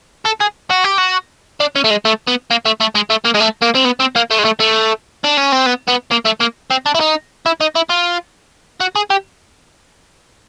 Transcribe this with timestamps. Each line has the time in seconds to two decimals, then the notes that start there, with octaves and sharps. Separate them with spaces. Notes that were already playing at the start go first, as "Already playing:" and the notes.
0.25 A4
0.40 G#4
0.70 F#4
0.84 G4
0.98 F#4
1.60 D4
1.76 C#4
1.84 A3
1.90 G#3
2.05 A3
2.27 B3
2.51 A#3
2.65 A3
2.80 A3
2.95 G#3
3.10 A3
3.25 A#3
3.35 G#3
3.40 A3
3.62 A#3
3.75 C4
3.85 B3
4.00 C4
4.16 A#3
4.31 A3
4.39 G#3
4.45 A3
4.60 A3
5.24 D4
5.37 C#4
5.52 C4
5.66 B3
5.88 B3
6.11 A#3
6.25 A3
6.40 A#3
6.71 C4
6.86 D4
6.95 E4
7.00 D#4
7.46 E4
7.61 D#4
7.76 E4
7.90 F4
8.81 F#4
8.96 G#4
9.10 G4